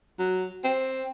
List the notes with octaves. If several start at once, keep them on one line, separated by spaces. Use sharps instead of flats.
F#3
C4